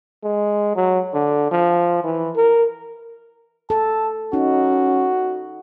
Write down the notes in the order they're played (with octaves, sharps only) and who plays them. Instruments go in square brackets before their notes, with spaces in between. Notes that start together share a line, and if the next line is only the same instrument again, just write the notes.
[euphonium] G#3
F#3
D3
F3
E3
A#4
[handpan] A4 [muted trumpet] A5
[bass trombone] C#4 [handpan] D#4 [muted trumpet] F#4